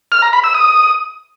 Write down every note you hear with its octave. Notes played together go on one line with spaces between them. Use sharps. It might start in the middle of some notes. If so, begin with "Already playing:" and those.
F6
A#5
B5
E6
D#6